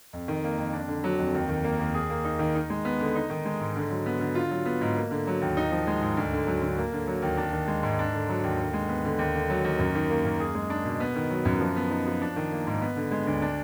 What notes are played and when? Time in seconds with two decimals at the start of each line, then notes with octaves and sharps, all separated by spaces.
0.13 F2
0.28 D#3
0.44 A#3
0.58 F2
0.73 D4
0.88 D3
1.04 F#3
1.19 F2
1.34 D#2
1.49 D#3
1.64 A#3
1.79 D#2
1.94 G#4
2.10 A#3
2.25 D#4
2.39 D#3
2.55 D#4
2.70 G#3
2.85 B3
3.01 D3
3.15 D#4
3.30 D#3
3.45 G#3
3.60 G#2
3.76 D3
3.90 F#3
4.06 B3
4.20 D3
4.35 F4
4.51 F#3
4.65 B3
4.81 G#2
4.97 A#3
5.11 D3
5.27 F#3
5.42 D#2
5.57 D#4
5.72 F3
5.87 G#3
6.01 G#2
6.17 D2
6.32 D3
6.47 F#3
6.62 D2
6.77 A#3
6.93 D3
7.07 F#3
7.22 D#2
7.37 D4
7.52 D#3
7.68 G#3
7.83 G#2
7.99 D4
8.13 D3
8.29 F#3
8.44 D#2
8.59 D3
8.73 G#3
8.89 B3
9.05 D3
9.19 D#2
9.35 D3
9.50 F#3
9.64 D#2
9.79 F#2
9.95 D#3
10.10 A#3
10.25 F#2
10.40 G#4
10.55 G#3
10.70 D4
10.85 B2
11.00 B3
11.16 D#3
11.31 F#3
11.45 F#2
11.60 F3
11.76 B3
11.90 D#4
12.07 F3
12.22 D4
12.36 D#3
12.52 A#3
12.67 G#2
12.81 B3
12.96 D3
13.11 G#3
13.27 D2
13.42 D4